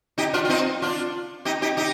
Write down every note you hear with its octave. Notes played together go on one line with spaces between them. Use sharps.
D#4 G4
D4 F4
F4
C4 D#4
D4 F4
D#4 G4
D#4 G4
D#4 G4